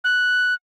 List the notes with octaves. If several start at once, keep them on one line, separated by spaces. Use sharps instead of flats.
F#6